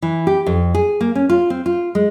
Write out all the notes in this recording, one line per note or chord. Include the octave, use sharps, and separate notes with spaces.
E3
G4
F2
G#4
A#3
C#4
F4
C4
F4
G#3